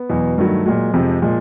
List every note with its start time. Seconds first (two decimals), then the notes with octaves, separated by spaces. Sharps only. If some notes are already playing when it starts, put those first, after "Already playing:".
Already playing: B3
0.10 E2 B2 F#3
0.38 G2 D#3 F#3 A3
0.66 A#2 F#3 G#3
0.94 F2 C3 F3
1.22 A#2 F3 G#3